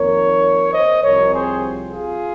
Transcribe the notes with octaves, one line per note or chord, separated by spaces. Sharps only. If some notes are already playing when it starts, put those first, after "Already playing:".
Already playing: F2 D#3 A#3 A#4 C#5
C5 D#5
C2 C3 F3 C4 A#4 C#5
G#4 C5
F4 G#4